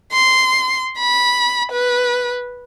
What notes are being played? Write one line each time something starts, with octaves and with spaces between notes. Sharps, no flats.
C6
B5
B4